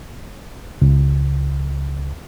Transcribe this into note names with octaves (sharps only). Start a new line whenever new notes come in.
C#2